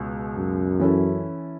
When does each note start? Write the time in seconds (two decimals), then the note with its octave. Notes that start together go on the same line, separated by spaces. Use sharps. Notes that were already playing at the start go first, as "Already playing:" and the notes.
Already playing: C#2 B2
0.36 F#2
0.80 E3 C#4 E4 A4